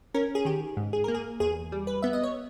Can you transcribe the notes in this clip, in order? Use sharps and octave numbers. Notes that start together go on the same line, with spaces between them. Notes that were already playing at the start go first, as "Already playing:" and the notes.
C#4 A#4
G#4
D#3 G4
G#2
G#4
A#3 A#4
G#4
E2 G#4
G3
B4
B3 E5
D#5
C#5